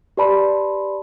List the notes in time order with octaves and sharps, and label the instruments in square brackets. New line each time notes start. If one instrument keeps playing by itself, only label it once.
[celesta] G4 B4 D5 A5 B5 C6